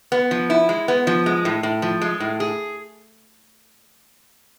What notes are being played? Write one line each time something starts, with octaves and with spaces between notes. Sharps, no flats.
B3
F3
E4
G#3
B3
F3
G#3
A2
A2
F3
G#3
A2
G#4